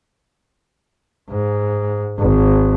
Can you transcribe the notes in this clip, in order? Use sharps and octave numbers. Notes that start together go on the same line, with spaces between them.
G#2
G#1